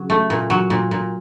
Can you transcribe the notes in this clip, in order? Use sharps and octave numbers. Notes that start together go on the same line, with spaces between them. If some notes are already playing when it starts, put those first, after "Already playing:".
Already playing: C#3 F#3
A3
A#2
F#3
A#2
A#2